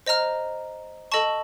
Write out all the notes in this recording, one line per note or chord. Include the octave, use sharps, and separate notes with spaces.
C5 D#5 A#5 F6
A4 D#5 A5 C#6